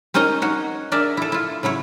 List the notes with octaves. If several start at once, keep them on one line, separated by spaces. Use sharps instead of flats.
C4 C#4 D#4 A#4 D#5 A#5
D#4 F#4 C#5
D4 G#4 A#4 D5 E5
E4 A4
E4 F4
C#3 F#3 E4 C#5